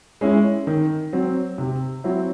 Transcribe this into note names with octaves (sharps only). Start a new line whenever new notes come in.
G#3 C#4 E4
D#3
F#3 C4
C3
F#3 C4 E4